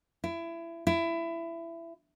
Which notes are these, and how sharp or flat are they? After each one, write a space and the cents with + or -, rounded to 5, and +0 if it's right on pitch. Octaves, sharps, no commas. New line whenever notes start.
E4 +25
E4 +20